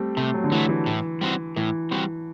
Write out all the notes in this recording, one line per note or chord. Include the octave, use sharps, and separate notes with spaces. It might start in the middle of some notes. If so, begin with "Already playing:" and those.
Already playing: G3 A3 C4
C3 A3
F#3
D3
E3 F#3 A3
E3
A2
G3 C4 F#4
A2 E3
G3 C4 F#4